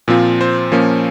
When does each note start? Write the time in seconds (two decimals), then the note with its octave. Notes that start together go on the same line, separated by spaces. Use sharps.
0.08 A#2 F3 C4 F4
0.41 C5
0.72 A#2 F3 A#3 C#4